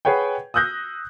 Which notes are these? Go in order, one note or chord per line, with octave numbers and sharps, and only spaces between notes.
G#4 B4 C#5 F#5 G5
D#6 E6 F#6 G6 A#6